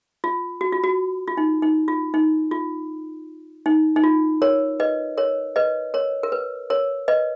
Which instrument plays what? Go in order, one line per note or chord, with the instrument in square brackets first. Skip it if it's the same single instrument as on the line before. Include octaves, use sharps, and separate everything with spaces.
[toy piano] F4
F#4
F4
F#4
F4
D#4
D#4
F4
D#4
F4
D#4
D#4
F4
A#4 C#5
B4 D#5
A#4 C#5
B4 D#5
A#4 C#5
A#4
B4
A#4 C#5
B4 D#5